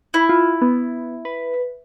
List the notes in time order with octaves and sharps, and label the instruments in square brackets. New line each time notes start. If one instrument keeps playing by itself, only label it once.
[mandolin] E4
[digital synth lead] F4
B3
B4